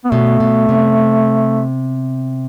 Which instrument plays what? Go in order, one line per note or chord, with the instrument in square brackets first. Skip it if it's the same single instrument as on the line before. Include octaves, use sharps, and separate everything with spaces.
[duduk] B3
[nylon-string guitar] B2 [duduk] A3
[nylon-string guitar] B2
C3